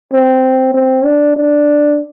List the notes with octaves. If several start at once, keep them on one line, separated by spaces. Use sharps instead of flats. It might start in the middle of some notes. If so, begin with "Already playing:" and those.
C4
C4
D4
D4